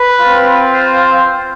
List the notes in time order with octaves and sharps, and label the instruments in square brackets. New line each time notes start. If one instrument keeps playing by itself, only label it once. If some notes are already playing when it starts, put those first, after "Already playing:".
Already playing: [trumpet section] B4
C4 F4
C5